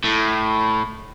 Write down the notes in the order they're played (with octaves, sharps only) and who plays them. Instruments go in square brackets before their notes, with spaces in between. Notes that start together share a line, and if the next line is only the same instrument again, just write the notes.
[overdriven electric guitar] A2